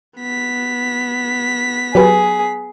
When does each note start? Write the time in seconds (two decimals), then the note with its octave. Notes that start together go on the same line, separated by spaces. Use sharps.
0.17 B3 B6
1.95 F#3 G4 G#4 B4